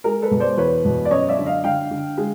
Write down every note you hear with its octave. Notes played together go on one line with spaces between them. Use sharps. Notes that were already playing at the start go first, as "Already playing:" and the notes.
G#3 A#4
A4 B4
B2
C5 D5
E2 B4 C#5
B2
D5
F#2 C#5 D#5
D5 E5
D3
D#5 F5
D3 F5 G5
D3
G#3